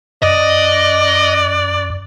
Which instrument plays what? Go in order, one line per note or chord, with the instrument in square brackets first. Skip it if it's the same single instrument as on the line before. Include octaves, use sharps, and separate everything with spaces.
[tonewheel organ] F#2 [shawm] D5 [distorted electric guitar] D#5